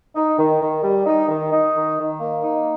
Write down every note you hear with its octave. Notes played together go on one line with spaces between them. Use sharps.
D#4
D#3
D#3
G3
D#4
D#3
D#4
D#3
D#3
A#3
D#4